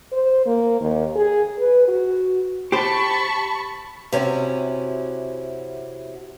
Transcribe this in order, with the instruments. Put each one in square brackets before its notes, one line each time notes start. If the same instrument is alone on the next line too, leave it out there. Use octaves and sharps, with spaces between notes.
[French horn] C5
A#3
D#2
G#4
B4
F#4
[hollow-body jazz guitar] G4 C5 [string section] A5 C#6 [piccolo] B5
[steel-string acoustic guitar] C3 C#4 E4 F#4